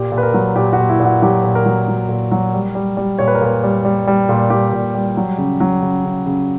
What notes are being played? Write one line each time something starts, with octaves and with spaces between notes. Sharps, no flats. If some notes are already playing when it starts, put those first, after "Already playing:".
Already playing: A#2 G4
A#2
B4
A#4
F#3
A#2 G4
F#4
A#2
E4
A#2
F#4
F#3 G4
A#2
A#4
F#3
F#3
A#2
F#3
G3
G3
G3
A#2 C#5
B4
A#4
A#2 B4
G3
G3
G3
A#2
G3 G4
A#2
G3
F#3
C#3
F#3
C#3
C#3
C#3